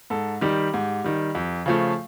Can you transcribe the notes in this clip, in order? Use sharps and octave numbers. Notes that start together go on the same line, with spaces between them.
G#2 A4
D#3 G3 G4
G#2
D#3 G3
F2
C#3 F3 A3